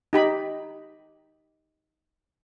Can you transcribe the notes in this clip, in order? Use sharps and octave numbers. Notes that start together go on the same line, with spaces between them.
D#4 G4 B5